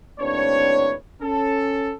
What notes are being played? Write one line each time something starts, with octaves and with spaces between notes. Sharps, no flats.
D#2 A2 C4 D4 B4 C#5
C#4 A4